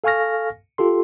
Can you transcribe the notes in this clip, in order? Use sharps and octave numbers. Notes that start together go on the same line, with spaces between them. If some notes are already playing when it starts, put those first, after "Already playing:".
A4 F5 G#5 C#6 F6 A#6
F4 G4 A4 C6